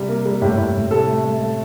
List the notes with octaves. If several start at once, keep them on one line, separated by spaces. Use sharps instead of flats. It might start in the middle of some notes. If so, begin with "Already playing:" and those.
Already playing: C3 G3
A#3
G3
A2 G4
A2
A2
C3 A4
A3
A3
A3